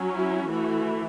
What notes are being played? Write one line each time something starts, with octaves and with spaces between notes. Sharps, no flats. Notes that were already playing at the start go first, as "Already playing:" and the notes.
Already playing: F#3 C#4
E4
E3 A3 E4 F#4